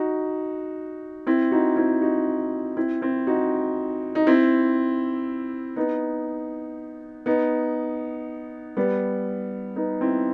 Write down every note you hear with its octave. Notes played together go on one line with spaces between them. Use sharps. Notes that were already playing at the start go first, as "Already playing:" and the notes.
Already playing: D#4 F#4
C4 E4
D#4 F#4
C4 E4
D#4 F#4
C4 E4
C4 E4
D#4 F#4
D#4
C4 E4
B3 D#4
B3 D#4
G3 B3
B3 D#4
C4 E4